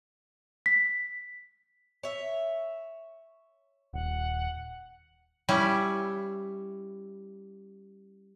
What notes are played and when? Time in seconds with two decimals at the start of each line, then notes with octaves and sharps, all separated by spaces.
0.66 B6
2.03 C#5 E5
3.93 D#1 F#5
5.49 G3 C#4 E4